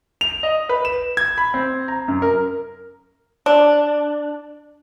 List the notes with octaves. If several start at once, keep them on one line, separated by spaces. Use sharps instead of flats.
F7
D#5
B4
E7
G#6
B5
C4
A#5
F#2
A#4
D4